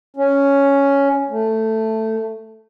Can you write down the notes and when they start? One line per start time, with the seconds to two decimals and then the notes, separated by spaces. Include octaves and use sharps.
0.17 C#4
1.30 A3